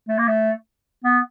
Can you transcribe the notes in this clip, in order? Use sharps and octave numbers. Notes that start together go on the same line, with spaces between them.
A3
A#3
A3
B3